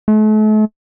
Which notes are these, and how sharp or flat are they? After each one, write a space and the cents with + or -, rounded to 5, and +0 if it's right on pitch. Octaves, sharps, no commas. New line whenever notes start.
A3 -40